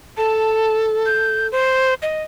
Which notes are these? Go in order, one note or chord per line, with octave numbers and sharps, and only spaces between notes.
A4 A5
G6
C5
D#5